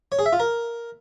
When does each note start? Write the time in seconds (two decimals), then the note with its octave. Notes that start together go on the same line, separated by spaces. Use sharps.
0.12 C#5
0.19 G#4
0.26 E5
0.33 F4
0.40 A#4